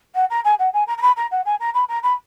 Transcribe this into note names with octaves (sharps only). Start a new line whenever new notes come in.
F#5
A#5
G#5
F#5
G#5
A#5
A#5
B5
A#5
F#5
G#5
A#5
B5
A#5
B5